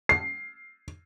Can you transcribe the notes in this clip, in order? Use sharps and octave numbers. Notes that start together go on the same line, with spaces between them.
C7